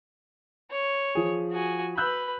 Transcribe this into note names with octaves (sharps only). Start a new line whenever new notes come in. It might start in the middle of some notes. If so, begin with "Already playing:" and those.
C#5
F3 G#4
F#4 G#5
B4 B5 E6 F#6 G6